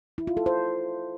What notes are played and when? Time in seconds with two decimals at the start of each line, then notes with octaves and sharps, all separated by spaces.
0.18 E4
0.27 F4
0.37 A4
0.46 C5